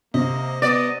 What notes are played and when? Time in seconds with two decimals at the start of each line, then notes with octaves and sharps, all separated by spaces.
0.14 C3 A#3 D#5
0.62 B3 D5 D#5